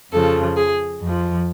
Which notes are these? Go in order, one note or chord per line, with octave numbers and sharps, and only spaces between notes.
F2 C#3 F3 A4
G#4
F2 F3